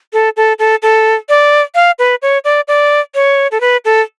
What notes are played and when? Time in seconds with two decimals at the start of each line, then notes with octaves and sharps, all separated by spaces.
0.13 A4
0.37 A4
0.59 A4
0.82 A4
1.29 D5
1.75 F5
1.99 B4
2.22 C#5
2.45 D5
2.68 D5
3.15 C#5
3.52 A4
3.61 B4
3.85 A4